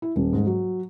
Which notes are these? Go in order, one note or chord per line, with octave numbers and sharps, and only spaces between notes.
E4
D#1
G#2
F#3